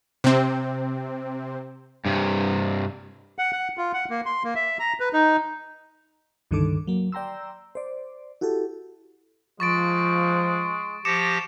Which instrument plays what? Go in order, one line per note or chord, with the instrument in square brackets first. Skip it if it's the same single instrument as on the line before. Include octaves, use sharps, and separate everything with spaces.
[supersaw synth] C3 C4
[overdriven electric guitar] G2 C3
[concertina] F#5
F#5
F4
F#5
A#3
C6
A#3
E5
A#5
B4
D#4
[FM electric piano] C#2 G2 D3 D#3 A4 D6
F#3 A#3
D5 G5 A#5 C6 E6
C5 D5
E4 F#4 G4 A4
[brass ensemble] F3 [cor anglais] G#3 [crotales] C#6 A6 D7
[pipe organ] F3 G4 A#6 [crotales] D6 C#7 E7